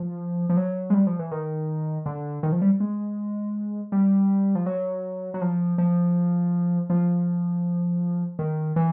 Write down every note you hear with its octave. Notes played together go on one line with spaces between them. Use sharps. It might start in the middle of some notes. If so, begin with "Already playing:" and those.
Already playing: F3
F3
F#3
G#3
G3
F3
E3
D#3
D3
D#3
F3
G3
G#3
G3
F3
F#3
F#3
F3
F3
F3
D#3
E3